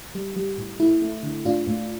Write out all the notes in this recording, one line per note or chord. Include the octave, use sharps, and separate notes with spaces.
G3
G3
A2
A3 E4
A3
D3
A2 D4 F4
A2